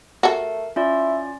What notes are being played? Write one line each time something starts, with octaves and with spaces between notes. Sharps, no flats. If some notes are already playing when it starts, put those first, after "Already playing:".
A3 F#4 A4 A#4
C#4 E4 F4 D5